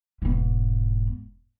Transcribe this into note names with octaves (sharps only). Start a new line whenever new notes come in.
E1 G#2